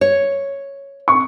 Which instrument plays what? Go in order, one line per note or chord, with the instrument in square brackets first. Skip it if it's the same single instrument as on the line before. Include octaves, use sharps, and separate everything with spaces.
[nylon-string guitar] C#5
[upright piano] C#6